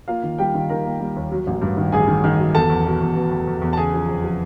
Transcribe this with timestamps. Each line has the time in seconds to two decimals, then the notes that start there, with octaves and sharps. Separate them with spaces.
0.08 A#3 F4 F5
0.23 D#3
0.38 G3 G4 G5
0.55 D#3
0.70 D#3 A#4 A#5
0.85 A#3
1.00 G3
1.16 D#2
1.32 F#3
1.47 A1
1.62 G2
1.77 D#3
1.92 A1 G#4 G#5
2.08 D#3
2.24 D#3
2.39 F#3
2.55 E2 A4 A5
2.70 E2
2.86 B2
3.01 E2
3.16 B2
3.31 E2
3.47 E2
3.62 E2
3.73 A5
3.77 C#3 G#4 G#5
3.94 F3
4.09 F2
4.24 F3